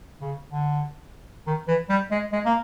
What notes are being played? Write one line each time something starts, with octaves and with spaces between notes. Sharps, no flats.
C#3
D3
D#3
E3
G3
G#3
G#3
A#3